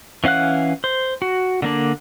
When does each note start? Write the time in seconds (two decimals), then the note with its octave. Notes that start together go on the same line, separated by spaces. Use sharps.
0.24 E3 C#4 F5 F#5 F#6
0.84 C5
1.22 F#4
1.62 D3 A#3 D4